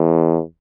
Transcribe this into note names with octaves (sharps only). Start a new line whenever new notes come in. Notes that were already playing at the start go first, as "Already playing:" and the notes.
Already playing: E2